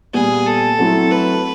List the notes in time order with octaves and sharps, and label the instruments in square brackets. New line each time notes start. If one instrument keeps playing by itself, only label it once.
[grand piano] A#2 G3 B3 [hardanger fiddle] G#4
[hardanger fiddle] A4
[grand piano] F#3 A3 C4 E4
[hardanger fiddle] B4